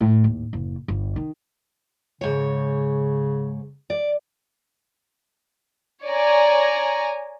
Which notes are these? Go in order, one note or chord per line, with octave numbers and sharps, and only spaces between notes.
A2
D#2
F#1
G1
D#3
G#2 C#3 C#5
D5
C#5 D5 G#5 A#5